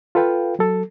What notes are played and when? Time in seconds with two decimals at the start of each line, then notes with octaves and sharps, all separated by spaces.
0.15 F4 A4 B4 F5 G5
0.59 F#3 A4